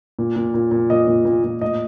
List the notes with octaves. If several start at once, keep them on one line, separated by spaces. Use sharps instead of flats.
A#2
A#2
A#2
A#2
A#2 D#5
A#2
A#2
A#2
A2 D#5